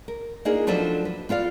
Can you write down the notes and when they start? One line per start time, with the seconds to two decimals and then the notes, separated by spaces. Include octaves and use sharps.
0.08 A#4
0.45 A#3 D4 D#4 F4 G#4 A#4
0.67 F3 F#3 D4 A4 B4 C5
1.05 B4
1.29 B3 F4 D5 F5